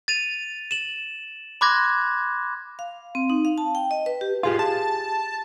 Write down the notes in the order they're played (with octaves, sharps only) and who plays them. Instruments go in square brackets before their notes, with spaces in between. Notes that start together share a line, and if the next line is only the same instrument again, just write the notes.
[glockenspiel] A6 D#7 F7
E7 F#7
B5 C6 D6 F#6 G#6 A#6
[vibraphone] F5
C4
D#4
F5
A5
G5
D#5
B4
G4
[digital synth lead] F4 [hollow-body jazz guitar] G4 G#4 F5
[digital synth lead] A5